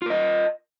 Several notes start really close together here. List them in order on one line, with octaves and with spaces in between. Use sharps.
F4 A#4 D#5